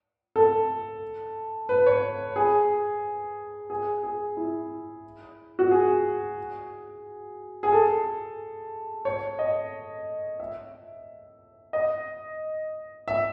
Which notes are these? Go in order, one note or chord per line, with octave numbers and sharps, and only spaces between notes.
A4
B4
C#5
G#4
G#4
G#4
E4
F#4
G#4
G#4
A4
C#5
D#5
E5
D#5
E5